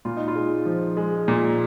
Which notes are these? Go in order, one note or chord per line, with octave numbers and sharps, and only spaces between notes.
A#2 F4
D#4
F4
G#3
F3
G#3
A#2